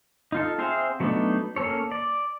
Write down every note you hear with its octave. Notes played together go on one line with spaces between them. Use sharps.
D#4 F4 A4
C4 G#4 C5 E5 F5
F#3 A3 B3 D4 D#4
A#3 C#4 A4 C#5
D5